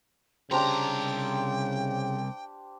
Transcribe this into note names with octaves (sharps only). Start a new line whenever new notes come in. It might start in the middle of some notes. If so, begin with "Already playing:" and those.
C2 C#3 D4 G4 C5 G5 A#5